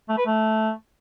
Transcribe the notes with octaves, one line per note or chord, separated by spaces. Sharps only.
A3
B4
A3